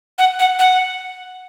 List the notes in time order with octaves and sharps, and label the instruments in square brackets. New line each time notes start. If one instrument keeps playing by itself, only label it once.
[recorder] F#5
F#5
F#5